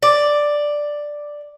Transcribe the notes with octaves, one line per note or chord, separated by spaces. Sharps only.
D5